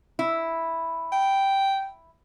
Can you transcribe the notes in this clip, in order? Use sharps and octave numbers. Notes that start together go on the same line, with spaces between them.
E4
G5